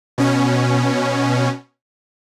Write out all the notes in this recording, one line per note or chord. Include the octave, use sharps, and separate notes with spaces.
B2 C#4